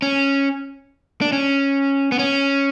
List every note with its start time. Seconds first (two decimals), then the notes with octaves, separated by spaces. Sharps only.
0.02 C#4
1.21 D4
1.32 C#4
2.12 B3
2.19 C#4